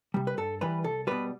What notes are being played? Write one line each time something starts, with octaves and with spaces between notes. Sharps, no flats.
C3 G3
B4
G2 A4
E3 G3 B4
C2 A4
B2 G3 B4